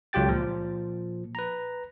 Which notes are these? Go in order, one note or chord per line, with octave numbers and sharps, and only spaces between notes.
C#2 F#3 F4 G4 G5 A6
A#2 F3
B4 A#5